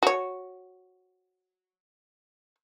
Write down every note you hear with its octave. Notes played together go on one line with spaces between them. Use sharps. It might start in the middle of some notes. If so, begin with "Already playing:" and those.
F#4 C#5